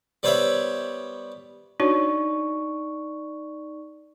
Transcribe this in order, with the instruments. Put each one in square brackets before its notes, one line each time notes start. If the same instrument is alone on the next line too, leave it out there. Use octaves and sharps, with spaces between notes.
[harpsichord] G3 B3 C5 C#5 E5 G5
[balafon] D4 F#4 C#5 [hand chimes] D#4 D5 C#6